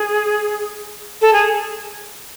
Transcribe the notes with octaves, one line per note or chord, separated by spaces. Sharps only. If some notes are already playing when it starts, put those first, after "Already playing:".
Already playing: G#4
A4
G#4